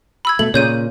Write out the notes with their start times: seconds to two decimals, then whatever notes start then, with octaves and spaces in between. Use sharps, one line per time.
0.25 B5 E6 G#6
0.39 B2 A3 F#7
0.54 A#2 C#3 C#5 G6 D#7